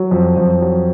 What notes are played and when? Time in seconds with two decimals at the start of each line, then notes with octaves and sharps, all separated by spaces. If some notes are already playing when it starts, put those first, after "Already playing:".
Already playing: F#3
0.11 F2
0.37 F2
0.62 F#3